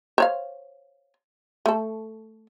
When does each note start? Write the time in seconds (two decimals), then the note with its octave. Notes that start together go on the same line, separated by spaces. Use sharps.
0.18 C5 C#5 F5
1.66 A3 A4